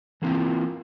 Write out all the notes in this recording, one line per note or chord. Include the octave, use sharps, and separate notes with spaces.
E3 A#3 C4 E4 F4